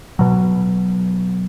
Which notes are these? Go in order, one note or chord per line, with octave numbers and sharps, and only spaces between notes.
B2 F#3